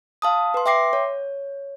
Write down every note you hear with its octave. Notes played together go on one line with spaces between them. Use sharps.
F5 A5 D#6
B4 C6
E5 G5 C6 D6 A#6 C7
C#5